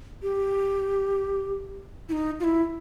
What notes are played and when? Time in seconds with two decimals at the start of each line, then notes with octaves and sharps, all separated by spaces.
0.23 G4
2.09 E4
2.12 D#4
2.40 F4
2.44 E4